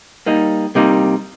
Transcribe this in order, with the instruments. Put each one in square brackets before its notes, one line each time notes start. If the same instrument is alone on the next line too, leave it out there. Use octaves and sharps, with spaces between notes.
[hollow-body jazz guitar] G3 A#3 D#4
C3 G3 A#3 D#4